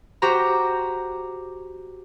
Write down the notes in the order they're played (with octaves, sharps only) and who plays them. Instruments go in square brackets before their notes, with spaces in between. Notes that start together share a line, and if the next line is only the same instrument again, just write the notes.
[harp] F#4 G4 C5 A#5